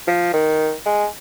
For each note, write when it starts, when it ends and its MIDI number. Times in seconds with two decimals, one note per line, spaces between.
0.07 0.30 53
0.33 0.73 51
0.86 1.06 56